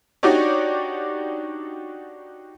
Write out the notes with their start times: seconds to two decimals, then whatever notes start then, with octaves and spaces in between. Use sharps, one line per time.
0.23 D4 D#4 F#4 G4 C#5 D5